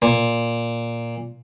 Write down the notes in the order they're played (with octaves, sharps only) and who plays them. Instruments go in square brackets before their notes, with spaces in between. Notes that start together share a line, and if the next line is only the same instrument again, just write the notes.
[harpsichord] A#2